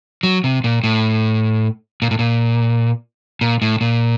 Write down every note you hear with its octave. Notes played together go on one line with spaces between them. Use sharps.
F#3
C3
A#2
A2
A#2
A2
A#2
A#2
A2
A#2